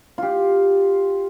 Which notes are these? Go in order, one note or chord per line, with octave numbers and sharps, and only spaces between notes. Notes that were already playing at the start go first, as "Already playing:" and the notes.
F4 G4